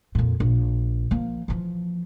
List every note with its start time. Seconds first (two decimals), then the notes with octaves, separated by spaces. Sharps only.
0.15 F2 A#2
0.40 A#1
1.11 F3 A#3
1.48 E3 F3